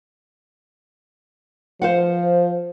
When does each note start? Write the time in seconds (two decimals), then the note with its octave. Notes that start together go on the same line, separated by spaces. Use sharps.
1.82 F3 C5 F5 F#5